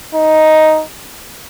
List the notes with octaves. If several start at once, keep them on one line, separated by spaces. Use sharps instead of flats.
D#4